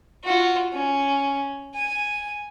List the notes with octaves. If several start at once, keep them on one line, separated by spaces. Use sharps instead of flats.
F4 F#4
C#4
G#5